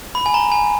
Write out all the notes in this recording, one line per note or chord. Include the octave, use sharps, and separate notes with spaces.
B5
G#5
A#5
G#5